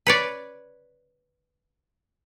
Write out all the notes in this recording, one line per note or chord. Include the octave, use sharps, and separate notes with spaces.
B4 C#5 D5